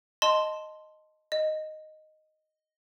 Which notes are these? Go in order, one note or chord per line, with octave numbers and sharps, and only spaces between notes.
D#5 A5 C6
D#5